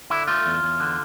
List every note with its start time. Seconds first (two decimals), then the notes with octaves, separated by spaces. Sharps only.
0.10 D3 E4
0.27 A3 F4
0.46 E2
0.63 E2
0.80 D3